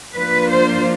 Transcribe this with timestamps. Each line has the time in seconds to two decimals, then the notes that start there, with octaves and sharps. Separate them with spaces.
0.15 F3 A#3 D4 F4 B4
0.51 C5